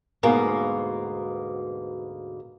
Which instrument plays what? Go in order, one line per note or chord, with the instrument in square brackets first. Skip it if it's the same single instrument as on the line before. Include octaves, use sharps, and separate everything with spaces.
[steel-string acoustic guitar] D2 G#2 B2 A#3